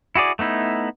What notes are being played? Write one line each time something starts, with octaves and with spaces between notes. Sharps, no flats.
E4 F#4 G#4 D5
A3 B3 D#4 E4